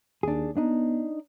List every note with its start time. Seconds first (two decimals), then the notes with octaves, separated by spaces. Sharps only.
0.23 D#2 D4 G#4
0.57 B3 D4 D#4